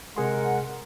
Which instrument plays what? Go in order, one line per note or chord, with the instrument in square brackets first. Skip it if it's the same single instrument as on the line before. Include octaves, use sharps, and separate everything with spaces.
[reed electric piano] C3 G#4 C6 [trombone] G#3 [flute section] A#4 F#5